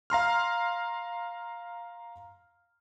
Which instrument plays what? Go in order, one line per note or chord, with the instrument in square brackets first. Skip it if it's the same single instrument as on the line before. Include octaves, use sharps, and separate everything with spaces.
[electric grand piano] F5 A#5 C6 F6